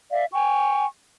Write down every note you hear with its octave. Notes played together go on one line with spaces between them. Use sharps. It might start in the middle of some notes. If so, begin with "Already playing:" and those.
D5 E5 F5
G5 G#5 C#6